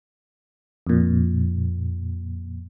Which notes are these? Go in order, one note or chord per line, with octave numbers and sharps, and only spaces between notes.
F2 A#2